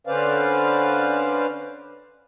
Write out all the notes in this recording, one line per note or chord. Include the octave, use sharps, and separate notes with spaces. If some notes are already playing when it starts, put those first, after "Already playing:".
D3 C#4 B4 C5 D5 F5